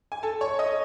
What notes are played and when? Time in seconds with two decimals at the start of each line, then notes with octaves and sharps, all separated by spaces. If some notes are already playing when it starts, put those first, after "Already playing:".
0.12 G#5
0.23 A4 A5
0.41 C#5 C#6
0.59 D#5 D#6